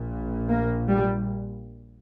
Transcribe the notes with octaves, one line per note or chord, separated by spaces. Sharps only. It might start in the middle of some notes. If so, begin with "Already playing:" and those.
Already playing: A#1 A#2
A#3
G3